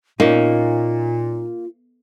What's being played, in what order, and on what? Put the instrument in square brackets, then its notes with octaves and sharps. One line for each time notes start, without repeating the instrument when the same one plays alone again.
[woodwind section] A#2 [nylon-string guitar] A#3 [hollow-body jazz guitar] C#4 D#4 [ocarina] F4